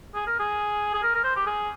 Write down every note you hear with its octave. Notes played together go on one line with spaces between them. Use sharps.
G#4
A#4
G#4
G#4
A#4
A#4
C5
G4
G#4